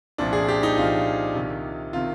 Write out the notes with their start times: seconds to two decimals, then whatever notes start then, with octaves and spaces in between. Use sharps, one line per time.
0.18 C2 A#2 F3 D4
0.33 G#4
0.48 G4
0.63 D#4
0.77 C2 A#2 F3 F4
1.35 C2 C3 D#3
1.93 C3 D#3 F4